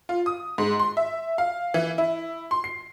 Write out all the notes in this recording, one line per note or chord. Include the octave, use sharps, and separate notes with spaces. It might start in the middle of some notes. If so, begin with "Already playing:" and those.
F4
D#6
G#2
C6
E5
F5
E3
E4
C6
C7